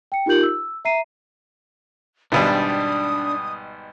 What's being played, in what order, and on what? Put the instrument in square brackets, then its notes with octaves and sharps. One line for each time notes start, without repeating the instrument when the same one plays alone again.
[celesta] G5 C#7
D#4 F4 G4 A#4 G6 F#7
E6
E5 A#5 C7 D#7
[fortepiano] G#1 B2 G3 [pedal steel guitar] D4 [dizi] D#6